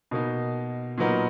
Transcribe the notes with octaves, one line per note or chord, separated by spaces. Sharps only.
B2 A#3 D#4
A#2 F#3 B3 D#4 A#4